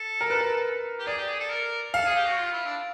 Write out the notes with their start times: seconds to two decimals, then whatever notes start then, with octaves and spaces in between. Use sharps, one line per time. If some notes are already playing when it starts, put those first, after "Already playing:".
Already playing: A4
0.21 A#4
0.30 B4
0.41 A#4
0.99 G4
1.06 G#4 D5
1.18 G4
1.28 G#4
1.40 A4
1.50 A#4
1.94 A4 F5
2.05 G#4
2.16 G4
2.26 F#4
2.37 F4
2.52 E4
2.66 D4